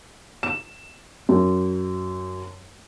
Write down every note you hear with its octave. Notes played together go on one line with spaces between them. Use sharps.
E7
F#2